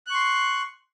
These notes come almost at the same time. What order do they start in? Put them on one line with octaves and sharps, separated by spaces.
F#6 C#6 C6